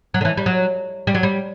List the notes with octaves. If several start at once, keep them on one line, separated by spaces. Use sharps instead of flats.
F#3
D3
E3
G3
F#3
G3
F#3
G3